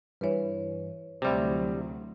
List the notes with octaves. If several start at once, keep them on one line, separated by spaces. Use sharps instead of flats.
G2 E3 B4 C#5
D2 C3 F#3 G3 C4 E4